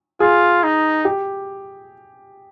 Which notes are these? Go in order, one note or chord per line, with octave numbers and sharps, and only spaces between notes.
F4 G#4
D#4
G4